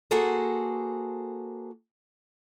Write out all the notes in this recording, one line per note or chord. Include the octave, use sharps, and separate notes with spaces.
A#3 F#4 G#4 A4 C5